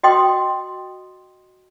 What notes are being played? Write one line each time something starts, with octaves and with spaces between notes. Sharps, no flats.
F#4 D#5 G5 C6 D#6